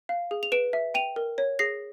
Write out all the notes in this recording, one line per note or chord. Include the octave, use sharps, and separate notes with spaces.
F5
G#4
F7
B4 D7 E7
E5
G5 D#7 F7
A#4
C#5
G#4 A#6 C7